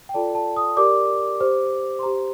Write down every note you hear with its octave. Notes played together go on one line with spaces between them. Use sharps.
G5
F4 A4 D5 A5
A5
D#6
G4 A#4 D5 D6
G4 C5
C6
G4 C5 A#5